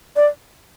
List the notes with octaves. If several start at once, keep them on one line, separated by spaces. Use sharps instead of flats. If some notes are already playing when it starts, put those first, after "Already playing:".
D5